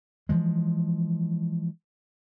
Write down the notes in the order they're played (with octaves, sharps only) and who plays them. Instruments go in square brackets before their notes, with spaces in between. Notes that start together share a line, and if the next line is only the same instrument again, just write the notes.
[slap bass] E3 F3 G#3